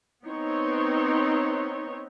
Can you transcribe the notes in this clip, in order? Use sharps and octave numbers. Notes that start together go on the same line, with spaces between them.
B3 C4 D#4 C#5